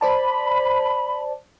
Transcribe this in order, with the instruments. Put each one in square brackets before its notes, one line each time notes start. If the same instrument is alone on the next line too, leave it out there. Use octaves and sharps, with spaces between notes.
[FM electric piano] C5 D5 A5 [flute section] B5